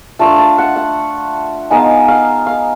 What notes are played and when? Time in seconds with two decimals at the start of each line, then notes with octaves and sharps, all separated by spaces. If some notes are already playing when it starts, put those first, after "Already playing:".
0.19 A3 D4 F4 A5
0.39 A5
0.58 F#5
0.76 F#5
1.70 G#3 B3 D#4 F5
2.08 F5
2.47 F5